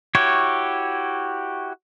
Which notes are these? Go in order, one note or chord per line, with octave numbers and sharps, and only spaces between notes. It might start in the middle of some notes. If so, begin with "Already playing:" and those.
E4 F#4 G4 C#5